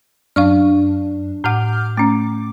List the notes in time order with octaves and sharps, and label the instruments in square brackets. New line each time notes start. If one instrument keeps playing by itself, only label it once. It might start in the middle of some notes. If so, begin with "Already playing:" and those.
[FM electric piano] F#2 D4 [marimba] F5 C#6 F6
[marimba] A2 F#5 [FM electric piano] D6 F6 G6
[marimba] A3 C#4 [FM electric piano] D6